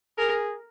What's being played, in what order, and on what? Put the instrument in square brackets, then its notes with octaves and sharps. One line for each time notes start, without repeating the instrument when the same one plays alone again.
[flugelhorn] G#4 [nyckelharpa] A#4